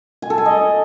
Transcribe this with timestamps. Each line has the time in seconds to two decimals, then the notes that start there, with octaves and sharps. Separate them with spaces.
0.22 G#5
0.30 A4
0.38 G#5
0.46 D#5